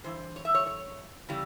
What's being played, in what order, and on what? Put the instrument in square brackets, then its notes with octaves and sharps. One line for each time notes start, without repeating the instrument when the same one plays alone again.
[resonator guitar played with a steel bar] G2 E3 C5
C#5
E5
C#5
C#5
C#3 E3 G3